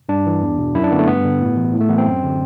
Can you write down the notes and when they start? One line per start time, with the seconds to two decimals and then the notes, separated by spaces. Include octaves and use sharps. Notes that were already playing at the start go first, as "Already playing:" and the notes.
0.09 G2 D4
0.26 E3
0.42 E2
0.58 B2
0.75 F#2 E4
0.84 D4
0.91 D3 B3
0.99 A3
1.07 G2 B3
1.25 D3
1.41 A2
1.56 E3
1.73 A2
1.81 A3
1.89 E3 B3
1.98 C4
2.06 F#2
2.23 D3